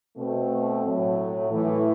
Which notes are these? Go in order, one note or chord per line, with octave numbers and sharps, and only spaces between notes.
B2 A3 C4
A2 F#3 A3
A2 E3 A3